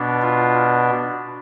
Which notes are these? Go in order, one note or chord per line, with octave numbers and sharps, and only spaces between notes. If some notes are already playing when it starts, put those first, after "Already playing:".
Already playing: B2 B3 D4
F4